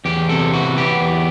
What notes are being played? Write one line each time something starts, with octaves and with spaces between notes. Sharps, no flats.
E2 G4
C3 A4
E3 F#4
B3 G4
E2